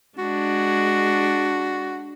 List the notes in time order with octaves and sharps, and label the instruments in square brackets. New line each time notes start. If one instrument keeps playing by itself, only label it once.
[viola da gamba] G#3 D4 [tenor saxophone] F#4